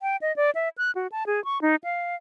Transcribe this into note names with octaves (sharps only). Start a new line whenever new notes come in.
G5
D#5
D5
E5
F#6
F#4
A5
G#4
C#6
D#4
F5